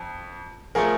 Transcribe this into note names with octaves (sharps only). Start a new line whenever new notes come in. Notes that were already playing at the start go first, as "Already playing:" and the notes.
Already playing: F2
F3 A3 G#4 A#4